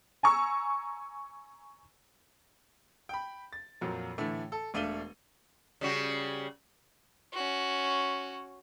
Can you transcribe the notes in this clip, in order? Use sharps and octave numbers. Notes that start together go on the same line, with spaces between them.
G#5 A#5 C#6 E6
G5 B5
A6
F2 A#2 F#3
A2 D3 E3 A3
A4
E1 A3 D4 F5 D#7 G7
C#3 G3 F#4
C#4 F#4